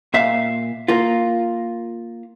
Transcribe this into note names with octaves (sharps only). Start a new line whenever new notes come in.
A#2 E5 F5
A#3 F4